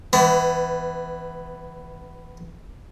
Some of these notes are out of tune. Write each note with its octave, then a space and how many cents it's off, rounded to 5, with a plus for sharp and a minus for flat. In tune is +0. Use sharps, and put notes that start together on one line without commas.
E3 +0 B3 +30